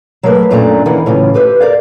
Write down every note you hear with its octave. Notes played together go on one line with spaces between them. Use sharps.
F#3 A3 A#3 A#4 B4
F#2 A#2 A3 A#3 D4 A#5
D#3 E3 A#3 C#4 F#5
A2 C#3 E3 F#3 F4
G4 B4 C5 E5
A#4 D5 F5